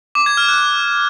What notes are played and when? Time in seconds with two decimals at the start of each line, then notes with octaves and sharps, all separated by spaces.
0.15 D6
0.26 G#6
0.37 F6
0.48 F#6